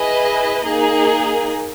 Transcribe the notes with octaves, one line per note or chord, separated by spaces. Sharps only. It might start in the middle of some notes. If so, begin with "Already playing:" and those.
Already playing: E4 G#4 B4 D#5
A#3 D#4 G#4